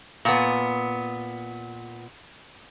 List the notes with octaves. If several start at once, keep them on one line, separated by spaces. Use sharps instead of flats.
A#2 B3